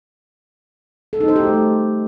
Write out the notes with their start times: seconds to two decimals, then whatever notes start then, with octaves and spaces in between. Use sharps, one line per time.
1.13 A4
1.20 D#4
1.28 C5
1.36 G4
1.43 A3